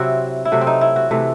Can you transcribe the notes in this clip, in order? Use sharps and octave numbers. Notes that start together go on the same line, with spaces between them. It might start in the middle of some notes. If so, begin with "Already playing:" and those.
Already playing: C3 F#3 C4 E4 F#4
E4
C3 F#3 A3 F#4
C4
D#4
E4
F#4
C3 E3 A3